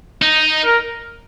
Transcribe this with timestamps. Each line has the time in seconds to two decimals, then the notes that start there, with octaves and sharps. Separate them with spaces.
0.22 D#4
0.64 A#4